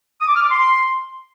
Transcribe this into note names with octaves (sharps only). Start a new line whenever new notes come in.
D#6
D6
F6
D6
C6